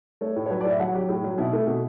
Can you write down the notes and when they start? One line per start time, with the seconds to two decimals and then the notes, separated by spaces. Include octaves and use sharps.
0.21 A3 C#5
0.36 A2
0.46 C#5
0.50 F#3 B4
0.61 D5
0.65 A2 E5
0.79 F#3 F#5
0.94 F#3 G4
1.09 A2
1.24 F#3
1.38 B2 E4
1.53 A3 E4
1.67 B2